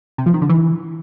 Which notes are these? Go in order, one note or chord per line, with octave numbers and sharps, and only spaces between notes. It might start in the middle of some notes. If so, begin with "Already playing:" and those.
C3
F3
D#3
D3
E3